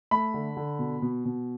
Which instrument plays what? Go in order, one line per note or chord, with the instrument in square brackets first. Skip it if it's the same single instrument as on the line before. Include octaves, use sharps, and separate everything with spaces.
[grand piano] A3 B5
D3
D3
B2
B2
B2